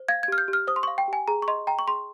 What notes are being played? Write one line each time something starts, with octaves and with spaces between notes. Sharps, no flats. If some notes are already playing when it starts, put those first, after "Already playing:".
Already playing: C5
F5 G#6
G#6
G4 F6
G6
G4
F6
C5 D#6
C6
C#6
F5
G5
G4 G#5
G#4 A#5
C#6
D#5 C6
G5 A#5
C#6
G#4 C6